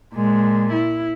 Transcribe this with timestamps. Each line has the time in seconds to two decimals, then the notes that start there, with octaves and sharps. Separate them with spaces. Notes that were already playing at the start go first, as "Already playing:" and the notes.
0.15 A#2 G#3
0.72 E4